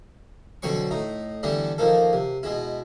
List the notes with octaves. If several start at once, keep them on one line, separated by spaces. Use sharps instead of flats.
B2 D3 F#3 C4 C#6
A2 D#4
D3 E3 G3 B3 D4 E4
D#3 F3 A#3 A4
C3
B2 G#3 E4